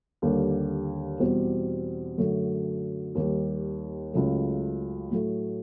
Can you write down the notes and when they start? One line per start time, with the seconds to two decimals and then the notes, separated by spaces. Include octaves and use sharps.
0.22 D#2 D3 G3 A#3 D4
1.20 E2 B2 G3 C4
2.18 F#2 D3 F#3 A3
3.15 D#2 D#3 G3
4.13 C#2 C#3 F#3 A3
5.11 A2 F#3 A3